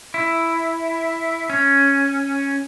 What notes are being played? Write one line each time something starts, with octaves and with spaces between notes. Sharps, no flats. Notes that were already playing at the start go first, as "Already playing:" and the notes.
E4
C#4